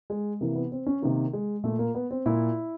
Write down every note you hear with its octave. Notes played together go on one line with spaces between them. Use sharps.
G#3
C3 E3 A#3
B3
C4
C#4
C3 D#3 A#3
G#3
A#2 A3
A#3
B3
C4
A#2 E4